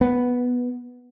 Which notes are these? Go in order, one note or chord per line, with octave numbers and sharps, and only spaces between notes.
B3